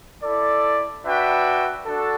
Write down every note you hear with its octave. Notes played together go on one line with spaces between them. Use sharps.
E4 A4 D5
D4 F#4 B4 E5 G5
D4 F#4 A4